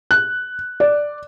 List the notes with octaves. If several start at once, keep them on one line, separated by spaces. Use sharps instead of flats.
F#6
D5